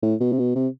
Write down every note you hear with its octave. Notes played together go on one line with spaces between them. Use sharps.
A2
B2
C3
B2
C3